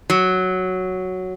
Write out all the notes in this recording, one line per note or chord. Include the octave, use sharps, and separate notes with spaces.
F#3